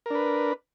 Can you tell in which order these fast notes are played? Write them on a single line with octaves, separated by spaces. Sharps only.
A#4 D4 B4